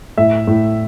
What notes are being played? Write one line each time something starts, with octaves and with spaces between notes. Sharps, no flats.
A2 E5
A2